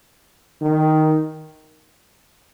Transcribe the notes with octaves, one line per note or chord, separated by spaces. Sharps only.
D#3